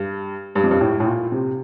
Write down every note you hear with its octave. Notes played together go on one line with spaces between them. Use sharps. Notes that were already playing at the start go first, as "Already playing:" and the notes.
Already playing: G2
G2
F2
G2
A2
A2
A#2
C3